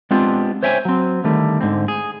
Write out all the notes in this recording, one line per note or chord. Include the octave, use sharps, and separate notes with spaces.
G#3 B3 C4 D4 F4 G4
C5 C#5 E5 G5 G#5
F#3 C4
D3 D#3 G3 A3
G#2 D3 C4
G#4